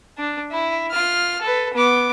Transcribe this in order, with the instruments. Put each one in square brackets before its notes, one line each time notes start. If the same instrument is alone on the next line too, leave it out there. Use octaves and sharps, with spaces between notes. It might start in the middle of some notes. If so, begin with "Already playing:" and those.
[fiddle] D4
E4
F4 F6
A4 B4
B3 D6